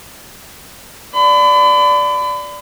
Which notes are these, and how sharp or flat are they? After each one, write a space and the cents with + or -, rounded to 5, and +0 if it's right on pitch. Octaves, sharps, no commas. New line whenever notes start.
D5 -5 B5 +35